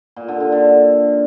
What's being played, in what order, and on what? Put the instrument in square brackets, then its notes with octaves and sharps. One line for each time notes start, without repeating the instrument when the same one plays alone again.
[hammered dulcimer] A#2
D3
D3
D3